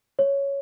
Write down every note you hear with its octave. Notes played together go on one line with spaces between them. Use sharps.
C#5